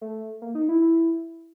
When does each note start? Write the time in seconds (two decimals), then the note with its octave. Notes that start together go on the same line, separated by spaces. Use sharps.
0.01 A3
0.42 A#3
0.55 D#4
0.69 E4
0.82 E4